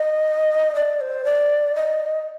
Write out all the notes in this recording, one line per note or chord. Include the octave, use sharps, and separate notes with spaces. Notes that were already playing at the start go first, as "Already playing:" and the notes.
Already playing: D#5
D5
C5
D5
D#5